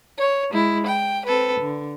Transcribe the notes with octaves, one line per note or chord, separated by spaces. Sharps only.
C#5
G#3 E4
G5
C4 A4 B4
D3